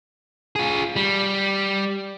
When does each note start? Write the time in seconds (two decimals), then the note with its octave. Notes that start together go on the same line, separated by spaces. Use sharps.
0.56 F4 G#4
0.96 G3